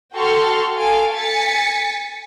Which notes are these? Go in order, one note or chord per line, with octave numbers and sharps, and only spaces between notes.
F#4 A4 G5 C6 C#6 F6
A4 F5 G#5 D7
G#5 A6 B6 C#7